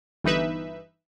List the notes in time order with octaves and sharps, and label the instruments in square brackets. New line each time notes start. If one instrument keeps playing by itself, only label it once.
[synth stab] G1 E3 D#4 B4 E5